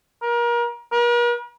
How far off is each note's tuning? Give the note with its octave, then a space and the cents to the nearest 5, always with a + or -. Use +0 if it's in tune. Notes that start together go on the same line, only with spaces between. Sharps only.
A#4 +30
A#4 +45